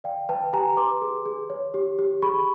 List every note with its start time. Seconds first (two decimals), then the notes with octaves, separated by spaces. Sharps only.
0.04 D5 F5 G5
0.29 B4 G5 A5
0.53 G4 G#5 A#5
0.77 B4 C6 D6
1.02 G#4
1.26 G#4
1.50 C#5
1.74 G4
1.99 G4
2.22 G#4 B5 C#6